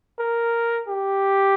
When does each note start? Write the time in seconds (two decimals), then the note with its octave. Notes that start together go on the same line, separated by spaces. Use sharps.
0.19 A#4
0.88 G4